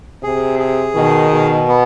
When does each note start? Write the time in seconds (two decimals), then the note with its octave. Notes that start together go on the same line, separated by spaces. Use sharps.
0.23 C3 G#4
0.59 G#4
0.95 B2 D#3
1.31 B2
1.68 B3